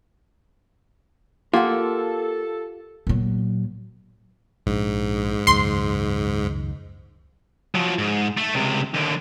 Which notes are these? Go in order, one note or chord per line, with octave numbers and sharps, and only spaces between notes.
A#3 F4 G4 A4 F#5
A#2 F#3
A#1 G#2 D3 D4
C#2 F#2 D#3 C6
F3 F#3
G#2
A3
C#2 C3
D#2 D3